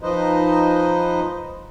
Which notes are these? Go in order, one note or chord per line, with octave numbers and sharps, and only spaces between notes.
F3 D#4 B4 C5 D#5